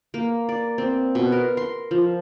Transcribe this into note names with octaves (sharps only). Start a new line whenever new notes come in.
A#3
D5
C4
B2
A#4
C6
F3